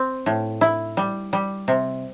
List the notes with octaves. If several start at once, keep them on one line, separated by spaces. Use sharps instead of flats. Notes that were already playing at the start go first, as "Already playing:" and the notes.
Already playing: C4
A2
E4
G3
G3
C3